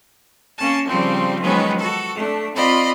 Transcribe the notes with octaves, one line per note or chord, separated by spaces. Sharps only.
A#3 C#4 A5
C#3 F3 G3 C4
D#3 F3 F#3 G#3 B3 C#4
F#4 A4
A3 D4
C4 F4 D5 D#5 B5